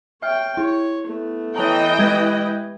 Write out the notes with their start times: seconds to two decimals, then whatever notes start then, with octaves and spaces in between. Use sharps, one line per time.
0.22 C#5 E5 G5 F6
0.57 E4 C#5
1.07 A3 B3
1.56 E3 C#5 D#5 G5 A5 A#5
1.99 G#3 G4 B4 G#6